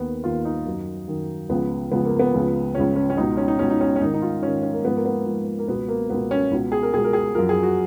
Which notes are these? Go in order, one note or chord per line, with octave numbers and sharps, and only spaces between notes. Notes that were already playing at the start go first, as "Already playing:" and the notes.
Already playing: D#2 D#3 B3
D#2 D#3 F4
D#4
F#2 D#3
F#2 D#3
C#2 C#3 F3 B3
C#2 C#3 F3 B3
A#3
B3
C#2 C#3 F3
C#2 C#3 F3 C#4
C#4
C#4
C#2 B2 D#4
C#4
D#4
C#2 B2 C#4
D#4
C#4
C#4
G#2 D#3 D#4
D#4
F4
G#2 D#3 C#4
C#4
A#3
G#2 F3 B3
A#3
B3
G#2 F3
A#3
C#2 B2 B3
A#3
C#2 B2 B3
C#4
C#2 B2
G#4
A#4
C#2 B2 G#4
A#4
G#4
F#2 F3 A#4
G#4
F#4